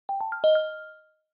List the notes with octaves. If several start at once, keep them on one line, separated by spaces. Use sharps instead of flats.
G5
A5
F6
D#5
F6